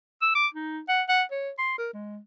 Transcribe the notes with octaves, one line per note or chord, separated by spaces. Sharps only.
E6
D6
D#4
F#5
F#5
C#5
C6
A#4
G#3